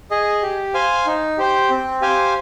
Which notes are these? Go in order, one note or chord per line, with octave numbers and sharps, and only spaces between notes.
G#4 D#5
G4
C5 F5 G#5
D#4
G4 C5 G5
C4
G4 C5 F5 G#5